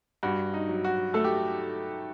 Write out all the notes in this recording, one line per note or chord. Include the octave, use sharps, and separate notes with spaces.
G2 F#4
D#4
F#3
F#4
A3 A4
G4